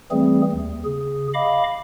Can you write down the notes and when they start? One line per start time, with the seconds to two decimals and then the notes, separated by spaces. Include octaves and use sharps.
0.11 E3 G3 A3 C4 G#4
0.53 D#2
0.85 C#3 G#4
1.34 D#5 F5 B5 D6